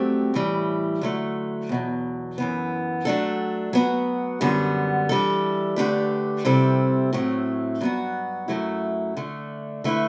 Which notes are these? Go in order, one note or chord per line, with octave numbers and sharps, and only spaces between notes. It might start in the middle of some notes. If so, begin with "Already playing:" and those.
Already playing: G2 F#3 A3 C4 G4
A2 E3 G3
D3 F#3 A3
E2 B2 F#3
F#2 E3 B3
F#3 A3 D4 A4
F#3 B3 F#4
F#2 D3 G3 B3
E3 G3 D4 A4
D3 A3 D4 G4 B4
C3 G3 C4 E4 A4
A2 F#3 A3 C4
G2 F#3 B3 F#4
F#2 F#3 A3 E4
D3 A3 D4
D3 A3 E4 B4